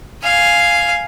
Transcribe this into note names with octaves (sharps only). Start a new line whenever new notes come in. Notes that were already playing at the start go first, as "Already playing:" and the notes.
F5 G#5